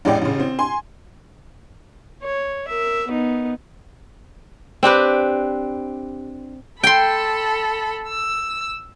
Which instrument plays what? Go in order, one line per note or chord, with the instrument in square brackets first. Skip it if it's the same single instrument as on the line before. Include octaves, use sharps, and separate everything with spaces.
[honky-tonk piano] A1 E2 G#3 C#4 D5 G5
A1 C#3
C4
G#5 C6
[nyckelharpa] C#5
A#4 E5
B3 D#4
[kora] C4 D4 G4 B4
[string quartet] A4 B5 [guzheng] G5 C6
[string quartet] E6